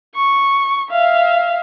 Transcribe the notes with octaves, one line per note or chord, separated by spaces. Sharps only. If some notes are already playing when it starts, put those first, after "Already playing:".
C#6
E5 F5